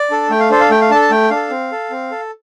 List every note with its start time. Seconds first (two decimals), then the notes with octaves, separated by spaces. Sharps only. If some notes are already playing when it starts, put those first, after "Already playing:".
Already playing: D5
0.11 D4 A4
0.30 A3 G5
0.40 F5
0.50 D4 A4 C5
0.60 F5
0.70 A3 G5
0.81 F5
0.90 D4 A5
0.94 A4
1.01 A5
1.10 A3 G5
1.30 D4 A4 F5
1.50 C4
1.72 A4
1.91 C4
2.11 A4